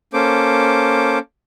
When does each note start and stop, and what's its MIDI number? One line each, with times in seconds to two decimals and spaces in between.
0.13 1.19 58
0.13 1.19 61
0.13 1.19 69
0.13 1.19 72
0.13 1.19 86